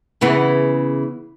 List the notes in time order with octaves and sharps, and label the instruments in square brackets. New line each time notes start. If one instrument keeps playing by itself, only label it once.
[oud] C#3 E3 B3